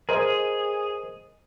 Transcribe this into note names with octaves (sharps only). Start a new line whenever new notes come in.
G#4 A#4 C5 D#5